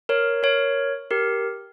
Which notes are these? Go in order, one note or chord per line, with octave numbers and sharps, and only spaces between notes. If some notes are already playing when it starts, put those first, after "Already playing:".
A#4 C#5
A#4 C#5
G4 A#4